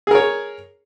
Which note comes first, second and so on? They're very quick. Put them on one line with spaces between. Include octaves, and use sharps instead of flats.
G#4 A#4 C#5